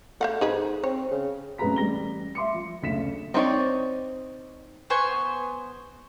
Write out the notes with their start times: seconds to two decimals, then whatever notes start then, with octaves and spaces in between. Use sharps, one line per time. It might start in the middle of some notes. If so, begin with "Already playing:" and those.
0.21 A3 C5 F5 F#5
0.41 G#2 D#4 G#4 B4
0.84 C4 C#5
1.11 C#3
1.58 F1 F#2 G#4 B4 A#5 B6
1.76 A1 G3 A#6 G7
2.35 E5 C6 D6 C#7
2.54 F3
2.82 F#1 D2 C#3 B6 C#7 E7
3.34 C4 D#4 F4 C#5 D5
4.90 B3 C5 G#5 C#6